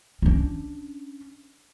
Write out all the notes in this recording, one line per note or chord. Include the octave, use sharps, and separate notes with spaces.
C#4 D4